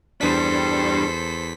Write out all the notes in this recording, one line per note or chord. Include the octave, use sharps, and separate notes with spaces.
E2 G3 D4 A4 C5 B6